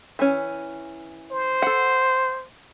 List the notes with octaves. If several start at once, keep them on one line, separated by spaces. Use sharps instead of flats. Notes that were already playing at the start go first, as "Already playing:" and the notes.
E3 C#4
C5
A4 F#5